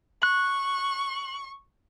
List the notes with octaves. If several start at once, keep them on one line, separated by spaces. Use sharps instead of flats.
C#6 F#6